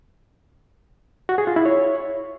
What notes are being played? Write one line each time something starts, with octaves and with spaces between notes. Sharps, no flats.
F#4
G#4
F4
E4
C#5